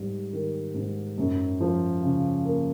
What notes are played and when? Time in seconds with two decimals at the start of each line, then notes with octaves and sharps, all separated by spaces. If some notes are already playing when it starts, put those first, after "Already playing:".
Already playing: G#2 G3
0.33 D#3
0.74 G#2
1.18 F#2
1.60 F3
2.03 C#3
2.45 A#3